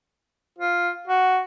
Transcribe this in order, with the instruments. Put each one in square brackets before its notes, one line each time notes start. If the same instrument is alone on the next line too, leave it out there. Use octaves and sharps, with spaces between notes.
[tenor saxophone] F4
F#4